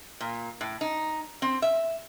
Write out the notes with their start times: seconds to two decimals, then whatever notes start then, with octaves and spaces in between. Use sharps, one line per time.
0.20 A#2
0.61 A2
0.81 D#4
1.42 C4
1.62 E5